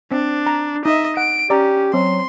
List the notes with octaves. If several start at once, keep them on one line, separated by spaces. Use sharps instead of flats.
C4 D4
A#5
D#4 D#5 E5
F#5 D7
C#4 G4 D5 A#5
F#3 C4 C6